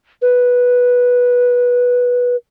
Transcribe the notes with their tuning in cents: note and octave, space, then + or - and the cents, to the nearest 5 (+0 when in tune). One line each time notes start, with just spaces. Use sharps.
B4 -10